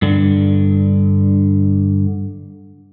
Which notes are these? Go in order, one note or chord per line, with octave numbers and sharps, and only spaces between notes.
G2 D3